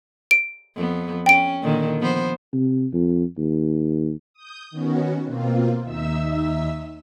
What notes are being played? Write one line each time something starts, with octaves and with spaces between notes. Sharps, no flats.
D7
F2 B3
C#4 G5 D7
A#2 D3 D#3
F3 B3 C5
C3
F2
D#2
D#6 G6
D#3 B3 C#4 F#4
B2 A#3 C4 F4
D#2 D#4 E5 E6